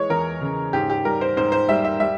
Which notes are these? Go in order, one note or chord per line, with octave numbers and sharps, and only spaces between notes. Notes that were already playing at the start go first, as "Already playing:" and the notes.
Already playing: E3 G#3 C#5
E2 A#4
C#3
G#2 G4
G4
G3 A#4
C5
G#2 C5
C5
G3 E5
E5
G3 E5